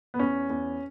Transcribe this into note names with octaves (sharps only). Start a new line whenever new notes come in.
B3
E2 C#4
E2